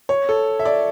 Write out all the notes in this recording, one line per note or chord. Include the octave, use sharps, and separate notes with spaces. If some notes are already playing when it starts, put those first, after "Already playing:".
C#5
A4
E5
D5